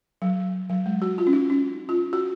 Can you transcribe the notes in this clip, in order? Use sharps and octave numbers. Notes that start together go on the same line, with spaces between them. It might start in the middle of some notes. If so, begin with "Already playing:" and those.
F#3
F#3
G#3
F#4
F4
C#4
D#4
C#4
F4
F#4